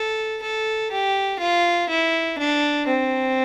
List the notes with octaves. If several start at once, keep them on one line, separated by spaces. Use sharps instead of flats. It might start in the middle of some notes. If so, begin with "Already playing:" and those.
Already playing: A4
A4
G4
F4
E4
D4
C4